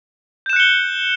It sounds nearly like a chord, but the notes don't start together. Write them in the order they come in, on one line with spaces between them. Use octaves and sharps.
G6 E7 F#6 C#7 G7